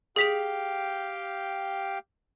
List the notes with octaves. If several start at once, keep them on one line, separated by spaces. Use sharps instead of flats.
G4 G#4 F5 G5 B6 F7